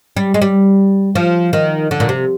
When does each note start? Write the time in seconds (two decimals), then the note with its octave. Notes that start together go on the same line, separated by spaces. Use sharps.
0.17 G3
0.34 G#3
0.42 G3
1.15 F3
1.53 D#3
1.91 D3
2.00 A#2
2.09 C3